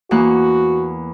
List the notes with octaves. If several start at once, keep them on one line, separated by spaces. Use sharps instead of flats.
E2 A#3 F#4 F#6